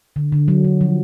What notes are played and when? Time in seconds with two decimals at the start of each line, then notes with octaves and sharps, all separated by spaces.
0.16 D3
0.32 D3
0.48 F#3
0.64 D3
0.81 F3